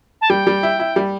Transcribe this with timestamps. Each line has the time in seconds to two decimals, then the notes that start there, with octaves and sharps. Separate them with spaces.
0.21 A5
0.30 G3 G5
0.47 G3
0.63 E4
0.80 E4
0.96 G3